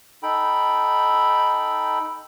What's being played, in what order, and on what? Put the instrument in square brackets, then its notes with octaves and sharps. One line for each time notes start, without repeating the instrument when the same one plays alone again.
[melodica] D#4 A4 G5 B5